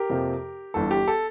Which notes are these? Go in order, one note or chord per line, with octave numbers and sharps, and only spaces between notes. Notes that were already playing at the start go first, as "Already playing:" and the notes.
Already playing: G4 A#4
F2 C3 F3 A#3
G1 G2 E3 A4
G4
A4